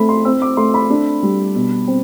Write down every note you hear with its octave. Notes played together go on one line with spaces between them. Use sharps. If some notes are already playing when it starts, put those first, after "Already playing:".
Already playing: A3 C4 B5
C6
C4 E6
D6
A3 C6
B5
D4
G3
B2
C4